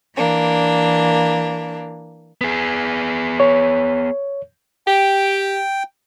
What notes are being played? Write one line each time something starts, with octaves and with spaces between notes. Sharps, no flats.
E3 A#3 D4
B3 G#4
C#5
G4 G5